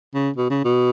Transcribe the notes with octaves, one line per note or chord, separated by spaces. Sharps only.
C#3
B2
C#3
B2